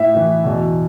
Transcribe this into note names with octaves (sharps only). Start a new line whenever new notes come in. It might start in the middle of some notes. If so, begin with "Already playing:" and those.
Already playing: A2 E5
A2 E3
E2 B2